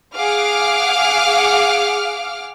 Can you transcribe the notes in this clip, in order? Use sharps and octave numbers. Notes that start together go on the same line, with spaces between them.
G#4 F5 F#5 D6 F6